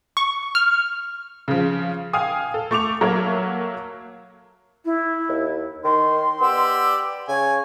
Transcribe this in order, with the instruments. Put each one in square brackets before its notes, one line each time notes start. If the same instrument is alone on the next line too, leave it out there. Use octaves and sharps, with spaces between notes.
[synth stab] C#6
F6
[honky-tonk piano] C#3 F3
F5 G5 G#5 D#6
A4
A3 C#6 D6 F7
F#3 A#3 A4 A#4 C#5 E5
[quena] E4
[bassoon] D#2
[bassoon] D#3 [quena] C6
[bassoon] B3 [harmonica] G4 D5 E6
[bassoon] C#3 [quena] C#5 [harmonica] G#5